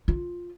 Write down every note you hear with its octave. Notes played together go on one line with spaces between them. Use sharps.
F4